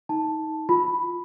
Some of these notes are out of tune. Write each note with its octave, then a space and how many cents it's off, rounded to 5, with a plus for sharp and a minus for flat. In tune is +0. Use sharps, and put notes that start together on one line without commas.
D#4 +25 A5 +0
F4 +5 B5 +0